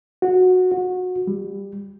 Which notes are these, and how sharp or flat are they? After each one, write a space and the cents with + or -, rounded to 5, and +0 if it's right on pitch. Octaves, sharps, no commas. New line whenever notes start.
F#4 -10
F#4 -20
G3 +25